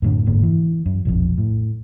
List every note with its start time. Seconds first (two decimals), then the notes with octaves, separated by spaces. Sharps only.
0.02 F#2 A2 D3
0.26 F1 G#2 A#3
0.43 E3
0.86 F#2
1.05 E1 A#1 F2
1.38 A2